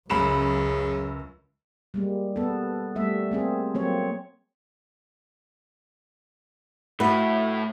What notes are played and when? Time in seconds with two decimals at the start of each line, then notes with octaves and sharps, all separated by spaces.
0.10 C#2 F#2 C#3 B5 E7
1.94 G3 G#3 A#3
2.36 B3 A4
2.96 G3 A3 E5
3.31 A#3 C4 G#4
3.75 F#3 A#3 C4 C#5
7.00 A2 E4 F#4 B4